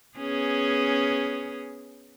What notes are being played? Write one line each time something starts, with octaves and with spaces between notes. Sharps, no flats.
B3 C#4 G#4